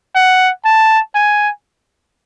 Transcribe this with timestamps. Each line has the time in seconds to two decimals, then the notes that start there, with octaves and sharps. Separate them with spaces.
0.15 F#5
0.65 A5
1.15 G#5